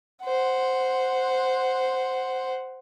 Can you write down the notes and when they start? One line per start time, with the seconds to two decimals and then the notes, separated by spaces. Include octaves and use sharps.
0.24 C5 F#5